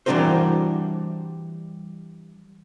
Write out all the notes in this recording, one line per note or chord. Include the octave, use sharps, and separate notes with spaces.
E3 G3 D4 F#4 A#4 C5